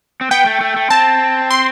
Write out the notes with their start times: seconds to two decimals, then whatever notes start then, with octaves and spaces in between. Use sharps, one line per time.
0.21 C4
0.31 B3 G5
0.46 A3
0.61 A3
0.76 A3
0.90 C4 A5
1.51 C6